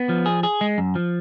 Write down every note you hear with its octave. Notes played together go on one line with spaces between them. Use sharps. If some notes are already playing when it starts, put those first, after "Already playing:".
Already playing: B3
F3
G#4
G#4
G#3
F#2
F3